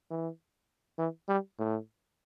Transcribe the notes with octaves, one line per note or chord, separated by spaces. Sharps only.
E3
E3
G3
A2